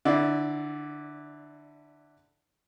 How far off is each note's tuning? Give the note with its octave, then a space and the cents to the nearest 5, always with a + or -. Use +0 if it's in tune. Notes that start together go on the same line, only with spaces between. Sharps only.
D3 +15 E4 -10 D5 -10